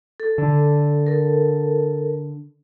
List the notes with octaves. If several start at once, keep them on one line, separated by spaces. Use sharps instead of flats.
A4
D3
A4 A#4